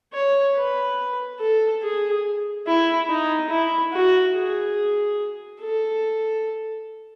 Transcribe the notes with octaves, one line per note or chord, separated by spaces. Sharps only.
C#5
B4
A4
G#4
E4
D#4
E4
F#4
G#4
A4